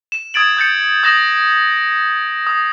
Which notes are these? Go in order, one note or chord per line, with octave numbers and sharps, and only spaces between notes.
E7
D#6 G#6 A6 D7 F#7
D#6 G6 A6 C#7
D#6 G6 A#6 E7 F#7
D#6